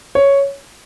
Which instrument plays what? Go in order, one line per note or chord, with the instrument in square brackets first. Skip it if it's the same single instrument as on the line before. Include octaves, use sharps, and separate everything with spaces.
[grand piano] C#5